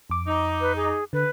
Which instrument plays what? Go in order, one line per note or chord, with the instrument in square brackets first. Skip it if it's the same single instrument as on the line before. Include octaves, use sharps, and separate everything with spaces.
[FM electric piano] F2 D6
[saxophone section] D#4
[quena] B4
G#4
[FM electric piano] D3 [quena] B4